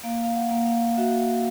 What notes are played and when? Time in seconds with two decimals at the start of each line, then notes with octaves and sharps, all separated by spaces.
0.03 A#3 F5
0.24 F5
0.35 F#5
0.51 A#3
0.66 F5
0.97 F#4 E5